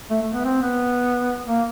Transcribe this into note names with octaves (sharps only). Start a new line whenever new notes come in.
A3
A3
B3
C4
B3
A#3